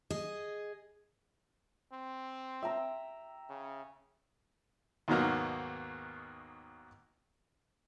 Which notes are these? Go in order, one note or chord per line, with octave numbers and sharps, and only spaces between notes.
G#4 D#5
C4
E5 G5 A#5
C#3
D#2 G#2 B2 D#3 F#3 A#3